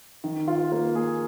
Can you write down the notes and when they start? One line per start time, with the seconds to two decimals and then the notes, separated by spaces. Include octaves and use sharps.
0.24 D#3
0.48 F4
0.72 A#3
0.95 G#4